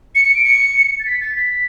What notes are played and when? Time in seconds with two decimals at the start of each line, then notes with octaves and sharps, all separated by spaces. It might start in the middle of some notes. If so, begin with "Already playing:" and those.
0.15 C#7
0.25 C#7
0.35 D7
0.45 C#7
1.00 A6
1.06 B6
1.21 A6
1.36 B6